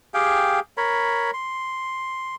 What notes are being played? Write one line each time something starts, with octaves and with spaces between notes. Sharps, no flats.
G4 G#4 F5 G5
A#4 C#5 B5
C6